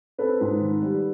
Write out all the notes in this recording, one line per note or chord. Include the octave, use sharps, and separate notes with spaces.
C4 A4 B4
G#2
D#3
G3